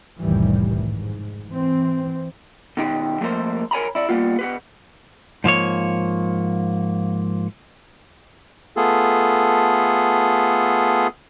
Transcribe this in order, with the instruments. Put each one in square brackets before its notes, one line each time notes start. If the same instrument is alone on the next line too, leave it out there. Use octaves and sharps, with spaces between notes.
[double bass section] F1 C2 A2 D#3 E3 G3
G#2
E3 C4
[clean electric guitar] B2 D#3 G4
F3 A3 A#3 A#4 C5
A#4 C#5 G#5 A#5 B5
E4 D5
G3 A#3 B3 F4
B3 G4 B4
G#2 F3 A#3 C#5
[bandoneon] A3 B3 F4 G#4 A4